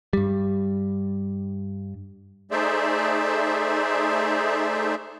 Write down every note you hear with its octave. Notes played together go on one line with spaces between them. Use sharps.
G2 G3
A3 D#4 G#4 C5 D5 E5